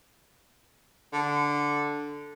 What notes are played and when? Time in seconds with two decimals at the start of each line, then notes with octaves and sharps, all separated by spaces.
1.13 D3